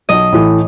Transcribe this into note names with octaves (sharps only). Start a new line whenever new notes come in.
B1 D#5
A2 E3 A3